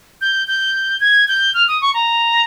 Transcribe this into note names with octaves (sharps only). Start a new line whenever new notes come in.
G6
G6
G#6
G6
F6
D#6
C#6
A#5